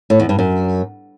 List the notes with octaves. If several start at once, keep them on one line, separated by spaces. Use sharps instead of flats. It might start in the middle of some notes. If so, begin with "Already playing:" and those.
A2
E2
G2
F#2